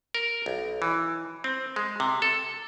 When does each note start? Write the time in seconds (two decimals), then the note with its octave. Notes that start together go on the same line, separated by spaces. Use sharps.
0.15 A#4
0.46 B1
0.82 E3
1.44 C4
1.76 G#3
2.00 C3
2.22 A4